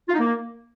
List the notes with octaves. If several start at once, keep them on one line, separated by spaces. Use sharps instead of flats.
F4
D#4
A#3